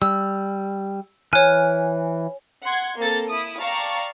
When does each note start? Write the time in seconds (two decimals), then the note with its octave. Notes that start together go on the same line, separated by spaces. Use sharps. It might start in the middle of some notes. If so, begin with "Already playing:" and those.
0.02 G3 E6
1.33 E3 C#5 G#5 F6 F#6
2.63 F#5 C6 G#6
2.98 A#3 C4 A4 A6
3.30 E4 D#6
3.60 D5 F5 G5 A5 A#5 C#6